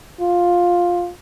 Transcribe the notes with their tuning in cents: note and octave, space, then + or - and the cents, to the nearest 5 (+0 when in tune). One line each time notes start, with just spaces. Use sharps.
F4 +10